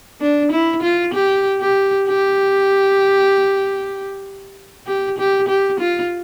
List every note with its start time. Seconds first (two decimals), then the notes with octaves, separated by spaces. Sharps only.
0.21 D4
0.52 E4
0.82 F4
1.14 G4
1.61 G4
2.08 G4
4.87 G4
5.18 G4
5.48 G4
5.80 F4